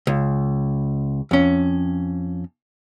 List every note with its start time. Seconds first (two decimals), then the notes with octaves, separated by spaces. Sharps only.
0.07 C#2
1.31 F2 C#4